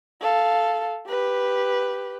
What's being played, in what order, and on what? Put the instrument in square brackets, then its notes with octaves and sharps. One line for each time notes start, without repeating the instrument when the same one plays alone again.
[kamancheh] A4 F5
G4 B4